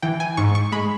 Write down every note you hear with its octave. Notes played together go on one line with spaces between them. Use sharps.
E3 G5
G#5
G#2 C#6
C#6
G#3 B5